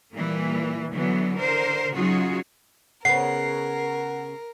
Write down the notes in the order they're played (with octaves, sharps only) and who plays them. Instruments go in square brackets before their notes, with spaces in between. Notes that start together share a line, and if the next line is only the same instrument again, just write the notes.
[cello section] A#2 E3 G3 A#3
D3 E3 F#3 B3
D3 A#4 C5
C#3 F#3 D#4 F4 F#4 G#4
[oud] C#3 B3 [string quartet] A#4 [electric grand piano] F#5 [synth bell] C7